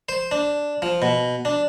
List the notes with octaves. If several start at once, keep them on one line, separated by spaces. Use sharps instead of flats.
C5
D4
F3
B2
D4